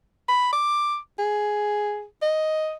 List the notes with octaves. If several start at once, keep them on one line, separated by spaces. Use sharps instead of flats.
B5
D6
G#4
D#5